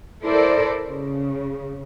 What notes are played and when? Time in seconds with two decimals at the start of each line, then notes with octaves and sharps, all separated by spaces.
0.24 E4 A4 A#4 C5 D5
0.88 C#3